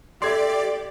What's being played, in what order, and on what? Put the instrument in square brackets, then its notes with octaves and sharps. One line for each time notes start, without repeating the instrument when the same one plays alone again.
[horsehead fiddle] G4 [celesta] A4 C6 [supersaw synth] D5 [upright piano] E5 G#6 C7